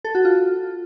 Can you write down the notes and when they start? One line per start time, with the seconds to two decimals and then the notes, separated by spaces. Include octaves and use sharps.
0.05 A4
0.15 F#4
0.25 F4